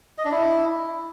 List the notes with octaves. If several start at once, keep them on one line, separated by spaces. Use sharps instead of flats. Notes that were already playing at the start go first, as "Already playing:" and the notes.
D#5
D4
E4